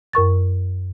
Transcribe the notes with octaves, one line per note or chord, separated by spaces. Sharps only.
F#2 A#4 C#6 A6